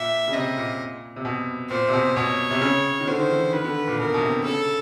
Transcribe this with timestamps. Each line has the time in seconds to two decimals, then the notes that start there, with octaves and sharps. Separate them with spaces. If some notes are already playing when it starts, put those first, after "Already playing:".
Already playing: A#2 E5
0.28 C#3
0.33 C3 D#5
0.57 A#2
1.16 C3
1.25 B2
1.70 A#2 C5
1.88 C3
1.93 B2
2.16 B2 C#5
2.51 C3
2.61 C#3
3.00 D#3
3.07 D3 C5
3.19 D#3
3.30 E3
3.53 D#3 B4
3.64 D3
3.88 A#2
3.99 B2 A#4
4.14 B2
4.22 C3
4.44 C#3 A4